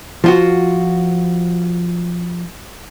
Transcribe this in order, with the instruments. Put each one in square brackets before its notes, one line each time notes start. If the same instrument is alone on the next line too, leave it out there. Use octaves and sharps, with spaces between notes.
[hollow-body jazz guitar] F3 F4 F#4